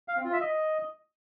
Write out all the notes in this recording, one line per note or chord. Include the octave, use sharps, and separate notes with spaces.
F5
C4
F4
E5
D#5